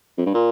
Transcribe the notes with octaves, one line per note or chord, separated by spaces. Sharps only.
F2
G2
A#2